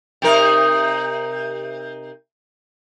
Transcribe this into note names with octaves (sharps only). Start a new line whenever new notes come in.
C3 D#4 A#4